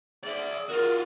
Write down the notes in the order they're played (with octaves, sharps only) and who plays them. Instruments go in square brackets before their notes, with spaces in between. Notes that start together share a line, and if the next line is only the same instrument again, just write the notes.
[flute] G#4 [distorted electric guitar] D5 E5
[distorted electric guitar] F4 F#4 [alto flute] A#4